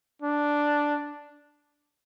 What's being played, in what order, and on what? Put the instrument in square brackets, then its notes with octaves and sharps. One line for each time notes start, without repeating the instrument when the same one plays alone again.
[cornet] D4